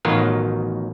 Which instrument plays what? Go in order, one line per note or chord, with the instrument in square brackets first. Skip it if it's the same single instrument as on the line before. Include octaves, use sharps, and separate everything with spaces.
[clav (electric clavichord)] A1 B2 D#3 F#3 F4 A#4